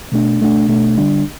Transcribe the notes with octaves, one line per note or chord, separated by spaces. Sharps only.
B2 A3 D4
B2 A3 D4
B2 A3 D4
D3 G3 D4